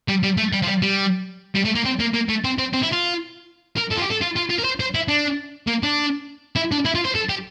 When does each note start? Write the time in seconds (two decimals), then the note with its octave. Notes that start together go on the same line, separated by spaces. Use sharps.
0.08 G3
0.23 G3
0.37 A3
0.53 G3
0.62 F3
0.67 G3
0.82 G3
1.55 G3
1.65 A3
1.76 A#3
1.85 C4
2.00 A#3
2.14 A#3
2.29 A3
2.45 C4
2.59 C4
2.74 C4
2.83 E4
2.93 F4
3.77 A#4
3.91 A4
3.96 F4
4.01 G4
4.10 A4
4.21 F4
4.36 F4
4.50 F4
4.58 A#4
4.64 C5
4.80 C5
4.95 E4
5.08 D4
5.67 A#3
5.83 D4
6.56 E4
6.72 D4
6.85 E4
6.95 F4
7.05 C5
7.15 A4
7.30 G4